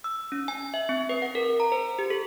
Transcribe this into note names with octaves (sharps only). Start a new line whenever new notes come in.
E6
C#4
G#5
E5
C4
B4
F#5
A#4
A#5
C5
G4
A4